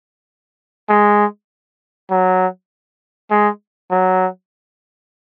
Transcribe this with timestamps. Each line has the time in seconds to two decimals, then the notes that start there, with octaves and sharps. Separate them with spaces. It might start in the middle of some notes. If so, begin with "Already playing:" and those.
0.89 G#3
2.10 F#3
3.31 G#3
3.90 F#3